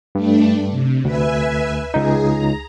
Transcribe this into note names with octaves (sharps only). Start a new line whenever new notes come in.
G2 A3 D4
C3
D2 B4 E5 G#5
C#2 D#4 G#4
A#5